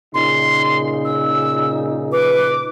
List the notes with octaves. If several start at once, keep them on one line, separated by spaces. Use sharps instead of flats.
A#2 C#3 D#4 C6
E6
B4 D6